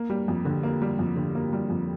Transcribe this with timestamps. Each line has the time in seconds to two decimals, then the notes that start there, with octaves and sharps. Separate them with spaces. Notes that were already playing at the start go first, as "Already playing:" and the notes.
Already playing: A#3
0.10 G3
0.28 F2
0.45 D3
0.63 A#3
0.82 G3
0.99 F2
1.16 D3
1.35 A#3
1.53 G3
1.70 F2